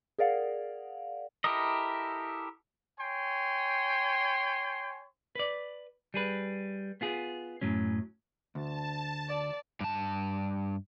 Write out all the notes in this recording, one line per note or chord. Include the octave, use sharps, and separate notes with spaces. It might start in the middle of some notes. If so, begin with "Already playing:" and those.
G#4 A#4 D5 F5 F#5
E4 G4 A4 A#4 D#5
C#5 G5 G#5 C6
B4 D5
G3 G#4 B4
B3 F4 G#4
F#2 A2 F#3 C#4
D2 A5
D5
G2 A5